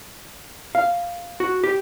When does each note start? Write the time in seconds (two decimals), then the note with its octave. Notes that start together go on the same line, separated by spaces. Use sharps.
0.75 F5
1.40 F#4
1.64 G4